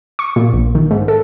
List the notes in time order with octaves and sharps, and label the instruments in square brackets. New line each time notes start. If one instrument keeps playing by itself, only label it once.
[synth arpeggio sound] C#6
A#2
A#1
D#3
G#2
A4